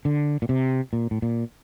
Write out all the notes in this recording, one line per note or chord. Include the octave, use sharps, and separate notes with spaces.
D3
A#2
C3
A#2
A2
A#2